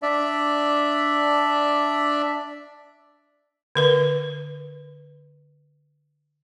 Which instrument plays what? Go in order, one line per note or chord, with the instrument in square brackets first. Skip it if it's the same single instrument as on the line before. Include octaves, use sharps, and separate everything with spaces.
[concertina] D4 D5 E5
[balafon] D3 A#4 B4